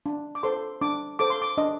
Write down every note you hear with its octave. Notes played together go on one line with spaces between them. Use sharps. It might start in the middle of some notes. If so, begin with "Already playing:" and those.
D4
D6
A4 C5 C6
D4 D6
A4 C5 D6
C6
D6
D4 D#5